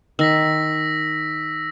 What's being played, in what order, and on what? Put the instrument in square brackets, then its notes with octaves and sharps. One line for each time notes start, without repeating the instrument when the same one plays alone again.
[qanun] D#3 [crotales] E6 A#6 B6